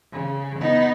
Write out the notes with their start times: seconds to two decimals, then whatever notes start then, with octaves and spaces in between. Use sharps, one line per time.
0.13 C#3
0.59 B3 D#4